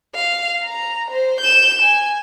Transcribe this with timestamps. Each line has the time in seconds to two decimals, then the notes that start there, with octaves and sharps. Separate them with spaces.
0.15 F5
0.64 A#5
1.11 C5
1.41 G6 E7
1.82 G#5